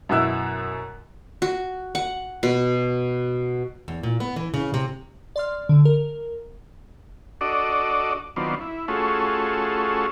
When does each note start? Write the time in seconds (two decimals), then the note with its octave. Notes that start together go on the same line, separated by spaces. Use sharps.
0.09 F#2 B2 E4 E6 F#6
1.42 F#4
1.95 F#5
2.43 B2
3.88 E2
4.03 A#2
4.20 B3
4.36 E3
4.54 C#3
4.74 C3
5.36 D5 C6 F6
5.69 D3
5.85 A#4
7.41 D4 F#4 A4 D5 D#5
8.36 D#3 F#3 B3 C4 D4 F4
8.61 E4
8.88 A3 C#4 F4 F#4 G#4 A4